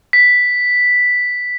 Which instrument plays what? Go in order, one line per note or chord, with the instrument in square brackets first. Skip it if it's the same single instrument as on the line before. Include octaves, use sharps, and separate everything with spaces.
[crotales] B6